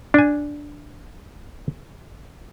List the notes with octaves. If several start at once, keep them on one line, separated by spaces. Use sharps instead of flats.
D4 G#5